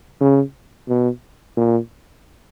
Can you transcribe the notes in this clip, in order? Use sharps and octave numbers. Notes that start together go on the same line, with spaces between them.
C#3
B2
A#2